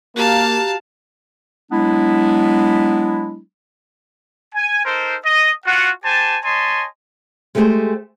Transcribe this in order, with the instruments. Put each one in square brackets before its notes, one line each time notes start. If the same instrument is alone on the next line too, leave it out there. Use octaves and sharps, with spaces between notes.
[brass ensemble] A#3 [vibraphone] F#4 G4 A#5 [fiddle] F5 A5
[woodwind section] F#3 G#3 B3 D4 E4
[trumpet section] G#5
D#4 A4 A#4 C5
D#5
F4 F#4 F#5
G4 C5 G#5 A5
C#5 D#5 G#5 A5 C6
[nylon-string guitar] G#3 A3 B3 G4 G#4 C5